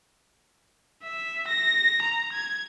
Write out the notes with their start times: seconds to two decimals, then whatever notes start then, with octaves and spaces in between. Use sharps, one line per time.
1.02 E5
1.48 A#6
2.02 A#5
2.33 G#6